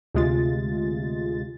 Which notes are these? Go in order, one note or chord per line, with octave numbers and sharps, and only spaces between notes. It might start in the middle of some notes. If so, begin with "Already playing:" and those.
D2 C3 G#3 F4 A6